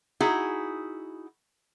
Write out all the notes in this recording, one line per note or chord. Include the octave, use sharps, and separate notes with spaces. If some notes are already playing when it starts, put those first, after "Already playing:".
D#4 E4 F#4 G#4